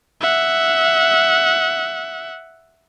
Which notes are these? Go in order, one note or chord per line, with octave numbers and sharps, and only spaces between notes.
E5 F#5